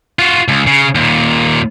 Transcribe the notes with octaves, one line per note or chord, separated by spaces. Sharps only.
F4 F#4
C#2
C#3
D#2 A#2